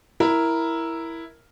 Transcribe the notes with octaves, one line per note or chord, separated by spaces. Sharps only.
E4 A#4